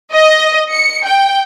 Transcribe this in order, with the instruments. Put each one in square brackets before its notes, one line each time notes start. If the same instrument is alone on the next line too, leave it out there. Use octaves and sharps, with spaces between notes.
[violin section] D#5
C#7
G5